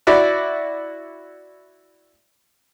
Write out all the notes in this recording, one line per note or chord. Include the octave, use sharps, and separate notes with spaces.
E4 F#4 D5 B5